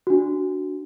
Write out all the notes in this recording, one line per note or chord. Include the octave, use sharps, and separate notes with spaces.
D4 F#4